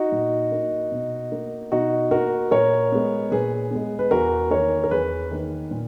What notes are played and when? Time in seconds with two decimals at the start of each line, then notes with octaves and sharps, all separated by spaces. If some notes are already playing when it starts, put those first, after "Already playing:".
Already playing: D#4 F#4
0.12 A#2
0.52 A#3
0.92 B2
1.32 A#3
1.72 B2 D#4 F#4
2.11 A#3 F#4 A#4
2.51 A#2 A#4 C#5
2.92 G#3 B3
3.31 A#2 G#4 B4
3.71 G#3 B3
3.99 B4
4.11 E2 F#4 A#4
4.51 D#3 A#3 A#4 C#5
4.84 A#4
4.91 E2 G#4 B4
5.31 D#3 A#3
5.71 A#2